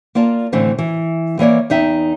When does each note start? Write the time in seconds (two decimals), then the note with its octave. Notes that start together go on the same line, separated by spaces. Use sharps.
0.15 A#3 F4 D5 A5
0.52 A2 D3 E3 A3 C4 D4
0.78 E3
1.39 E3 A#3 C#5 D5
1.70 E2 D#4 E5 G5